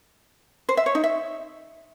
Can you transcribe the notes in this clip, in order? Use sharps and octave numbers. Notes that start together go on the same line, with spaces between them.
C5
E5
C#5
D#4
E5